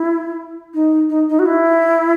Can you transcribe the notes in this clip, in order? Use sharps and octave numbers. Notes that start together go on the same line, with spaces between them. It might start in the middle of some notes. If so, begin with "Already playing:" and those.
Already playing: E4
D#4
D#4
D#4
F#4
E4